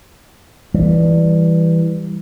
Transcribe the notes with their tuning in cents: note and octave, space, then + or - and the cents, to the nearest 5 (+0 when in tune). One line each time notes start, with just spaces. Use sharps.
E3 +0 G3 +5